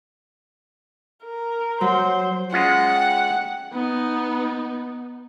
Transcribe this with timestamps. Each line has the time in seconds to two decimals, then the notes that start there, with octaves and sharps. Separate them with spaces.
1.23 A#4
1.81 F#3 C5
2.53 G#3 C#4 F4 F#5
2.96 G5
3.72 B3 D#4